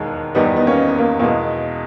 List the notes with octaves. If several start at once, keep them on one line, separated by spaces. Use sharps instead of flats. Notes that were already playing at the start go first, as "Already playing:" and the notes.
Already playing: E1 D#2 D#3 G#3
E2 D#3 G3 B3 D#4
B3 D#4
B3 D#4
A#3 C#4
B3 D#4
B3
A#3
E2 B2 G#3 A#3